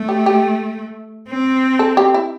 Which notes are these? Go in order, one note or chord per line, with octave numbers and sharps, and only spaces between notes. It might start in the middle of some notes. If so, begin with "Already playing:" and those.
Already playing: A3
G4
G4
C4
A4
G4
E4